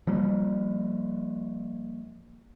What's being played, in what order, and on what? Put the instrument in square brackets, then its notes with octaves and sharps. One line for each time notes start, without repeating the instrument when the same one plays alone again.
[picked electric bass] F3 G3 A#3